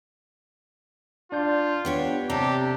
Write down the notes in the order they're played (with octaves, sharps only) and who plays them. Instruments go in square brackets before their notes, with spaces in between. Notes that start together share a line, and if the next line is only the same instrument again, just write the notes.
[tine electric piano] D4 D5 G6 [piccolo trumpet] F4
[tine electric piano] B3 [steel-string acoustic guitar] D4 G4 C#5
[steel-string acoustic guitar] C3 D4 A4 [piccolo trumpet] G4 [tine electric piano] G5 A#5